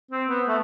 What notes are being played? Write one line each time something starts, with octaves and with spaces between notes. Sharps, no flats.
C4
B3
A3